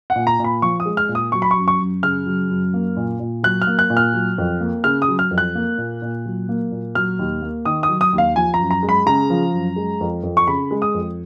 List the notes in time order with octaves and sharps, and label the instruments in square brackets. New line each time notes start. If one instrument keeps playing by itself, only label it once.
[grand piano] F#5
A#2
A#5
A#2
B5
F3 C#6
D#6
G#3
F6
A#2
D#6
F#3 C#6
B5
C#6
F#2
C#6
F#2
C#3 F6
F#3
F#2
A#3
A#2
A#2
F#3 F#6
F6
A#3
F#6
A#2
F6
F#3
F2
A#3
C#3 F6
D#6
F#3
F6
F2
F#6
A#3
A#2
A#2
F#3
A#3
A#2
F#3 F6
D#2
A#3
D#3 D#6
D#6
F#3
D#6
D#2
F5
F3 G#5
A#5
F#2
A#5
G#3
B5
C#3 A#5
F3
F#2
G#3
F2
F2
C#6
C#3 B5
G#3
D#6
F2